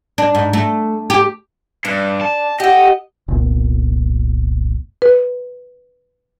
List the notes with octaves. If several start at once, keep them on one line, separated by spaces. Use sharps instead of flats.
D4
G#2
A3
G4
G2 D4
A5
G4 A4 D#5 F#5
F1 C2 A#2 B3
B4